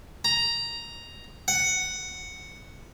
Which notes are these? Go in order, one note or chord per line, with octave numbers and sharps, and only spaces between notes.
A#5
F#5